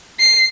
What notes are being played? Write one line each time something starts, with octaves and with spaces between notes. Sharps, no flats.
C7